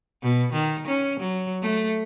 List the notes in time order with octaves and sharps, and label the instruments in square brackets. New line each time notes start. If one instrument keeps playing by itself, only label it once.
[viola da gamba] B2
D#3
C#4
F#3
A3